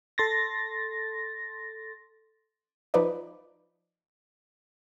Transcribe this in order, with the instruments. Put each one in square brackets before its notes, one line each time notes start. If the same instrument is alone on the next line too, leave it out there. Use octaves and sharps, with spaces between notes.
[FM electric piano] A4 C6 A6 A#6
[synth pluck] F3 D#4 B4 D5 D#5